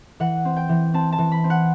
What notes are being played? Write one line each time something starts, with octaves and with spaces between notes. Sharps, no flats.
E3 F#5
C4
G5
E3
C4 A5
A5
E3
B5
C4
F#5